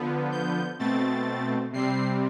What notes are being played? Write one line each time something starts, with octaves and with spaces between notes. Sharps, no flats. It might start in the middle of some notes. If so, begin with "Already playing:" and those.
Already playing: D3 F3 B3
G6
B2 A3 C4 A6
C3 G3 C4 C7